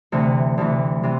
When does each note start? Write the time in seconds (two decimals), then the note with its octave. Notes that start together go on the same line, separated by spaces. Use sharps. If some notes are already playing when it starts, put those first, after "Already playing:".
0.12 D2 C3 E3
0.58 D2 C3 E3
1.03 C3 E3